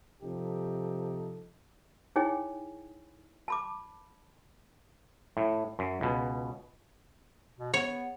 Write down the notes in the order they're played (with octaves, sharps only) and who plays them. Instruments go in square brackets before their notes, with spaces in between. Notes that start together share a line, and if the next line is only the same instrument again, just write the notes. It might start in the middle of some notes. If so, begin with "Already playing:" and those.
[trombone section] C3 F3 D#4 G4 A4
[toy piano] D#4 E4 G#4 C#5 G5 G#5
A5 B5 D6
[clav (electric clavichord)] A2
F#2
C#2 B2
[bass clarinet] B2
[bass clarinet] B3 [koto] C#5